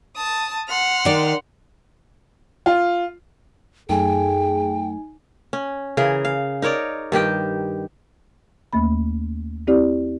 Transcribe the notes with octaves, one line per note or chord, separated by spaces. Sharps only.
A5 D#6
F#5 C6 F6
D#3 D5
F4
F#2 A3 D#4 G#4 G5 G#5
C#4
C#3 E3 G#4 A#4
F5
D#4 A#4 C#5 D5
G2 D#3 G4 G5
D#2 A3 A#3 B5
C4 E4 G4 D5